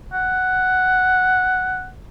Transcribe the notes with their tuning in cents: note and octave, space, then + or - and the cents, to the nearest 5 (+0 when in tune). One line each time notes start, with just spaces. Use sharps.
F#5 +5